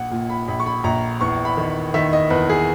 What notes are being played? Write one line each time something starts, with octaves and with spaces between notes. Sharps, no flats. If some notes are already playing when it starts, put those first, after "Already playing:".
Already playing: A#1 F#5
A#2
B5
A#1 B5
C#6
B5
A#1 A#5
E2 C#6
B5
D#3
D#3 E5
D#5
E2 B4
G#4